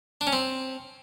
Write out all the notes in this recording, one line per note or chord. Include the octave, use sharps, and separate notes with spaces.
D4
C#4
C4